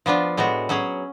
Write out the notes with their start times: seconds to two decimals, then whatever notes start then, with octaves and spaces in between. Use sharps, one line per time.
0.06 F3 B3 D4 F4
0.37 A2 G#3 B3 F#4
0.69 F#3 C#4 G#4